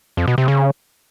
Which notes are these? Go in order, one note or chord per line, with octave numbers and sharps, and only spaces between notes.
F2
B2
C3
C#3